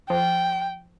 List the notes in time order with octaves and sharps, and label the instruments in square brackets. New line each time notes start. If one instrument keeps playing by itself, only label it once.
[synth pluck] F3 [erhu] G5